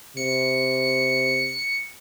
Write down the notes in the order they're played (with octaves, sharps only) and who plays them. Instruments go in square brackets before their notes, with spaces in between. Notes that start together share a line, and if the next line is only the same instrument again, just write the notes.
[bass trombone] C3 [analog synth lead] C#7